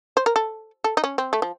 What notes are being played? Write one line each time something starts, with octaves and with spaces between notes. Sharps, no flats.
C5
A#4
A4
A4
D#4
C#4
C4
A3
F3